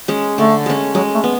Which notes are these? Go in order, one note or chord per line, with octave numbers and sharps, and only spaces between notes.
G#3 C#4
D3 A3
G#3 C#4
F#3 G#3
A3
B3